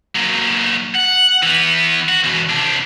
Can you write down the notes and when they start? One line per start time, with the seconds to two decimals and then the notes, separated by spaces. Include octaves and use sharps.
0.16 A#2 F#3
0.95 F#5
1.43 E3 B3
2.09 F#4
2.24 E2 B2
2.49 C2 D4